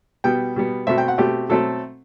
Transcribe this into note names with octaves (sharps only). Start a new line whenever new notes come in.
B2 G3 B3 G5
B2 G3 B3
B2 A3 C4 E5
G5
F#5
B2 A3 C4 G4
B2 F#3 A3 C4 A4